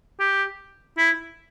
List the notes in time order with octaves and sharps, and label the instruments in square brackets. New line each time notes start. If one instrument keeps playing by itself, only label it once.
[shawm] G4
E4